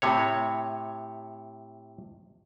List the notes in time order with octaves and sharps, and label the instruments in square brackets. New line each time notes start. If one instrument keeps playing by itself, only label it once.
[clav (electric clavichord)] A2 C3 C#5